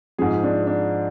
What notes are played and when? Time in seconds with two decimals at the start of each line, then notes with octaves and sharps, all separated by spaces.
0.18 G#2 F3 G#4
0.43 D4
0.67 D4